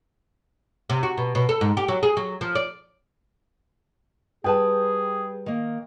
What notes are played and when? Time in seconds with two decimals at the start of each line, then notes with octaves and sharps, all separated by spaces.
0.90 C3
1.03 F#4
1.18 B2
1.35 B2
1.49 A4
1.61 G#2
1.77 G4
1.88 F#3
2.03 G#4
2.17 F#3
2.41 F3
2.55 D5
4.44 G3 G#4 B4 G5 A5
5.46 D#3 A#3